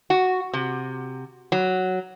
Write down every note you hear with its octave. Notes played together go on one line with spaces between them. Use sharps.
F#4
C3
F#3